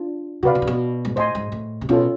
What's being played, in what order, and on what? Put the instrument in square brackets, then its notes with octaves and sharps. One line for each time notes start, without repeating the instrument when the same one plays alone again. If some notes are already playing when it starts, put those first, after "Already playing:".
Already playing: [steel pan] D4 F4
[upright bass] C3 [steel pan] F#4 B4 D5 F5
[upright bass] B2
C3
B2
G#2
[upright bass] A2 [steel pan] C5 D#5 G#5 C6
[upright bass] G#2
A2
C3
[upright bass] B2 [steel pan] C#4 F4 A4